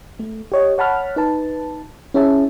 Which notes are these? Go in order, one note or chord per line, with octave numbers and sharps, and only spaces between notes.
A3
G4 C#5 D#5
C#5 F#5 A5 B5 F6
D#4 B4 A5
C#4 E4 G#4 C#5 E5 A5